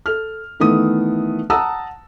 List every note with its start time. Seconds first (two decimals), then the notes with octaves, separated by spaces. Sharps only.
0.06 A4 F6
0.60 D#3 E3 A3 B3 D#6
1.50 F#5 A5 A#5 D#6 E6